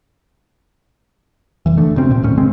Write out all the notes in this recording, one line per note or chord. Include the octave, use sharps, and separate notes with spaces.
F1 E3
D3 A3
D2 C3 C4 C#4
A#2 C4
D#2 A2 C#4
G#1 C#3 G#3 C4